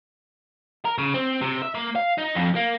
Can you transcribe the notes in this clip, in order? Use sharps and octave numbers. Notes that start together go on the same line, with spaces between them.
A#4
C#3
C4
C3
E5
A#3
F5
D#4
F2
A#3